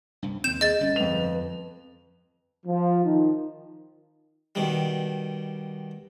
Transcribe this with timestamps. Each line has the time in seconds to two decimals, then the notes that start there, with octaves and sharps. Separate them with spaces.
0.22 C2 G2
0.44 D#2 C4 G6 E7
0.61 G#4 D#5 A6
0.81 G1 C#4
0.96 F2 B4 F7
2.66 F3
3.04 D#3
4.55 B2 D#3 G3